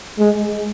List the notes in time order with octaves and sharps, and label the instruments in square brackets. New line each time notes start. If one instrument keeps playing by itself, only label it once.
[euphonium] G#3